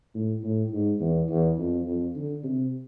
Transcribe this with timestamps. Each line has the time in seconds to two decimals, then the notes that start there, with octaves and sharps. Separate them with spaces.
0.15 A2
0.43 A2
0.72 G#2
1.00 E2
1.29 E2
1.59 F2
1.86 F2
2.15 D3
2.43 C3